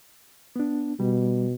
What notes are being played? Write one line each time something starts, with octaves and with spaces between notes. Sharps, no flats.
B3 D4
B2 G3